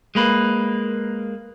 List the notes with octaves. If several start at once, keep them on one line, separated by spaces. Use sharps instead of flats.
G#3 A#3 B4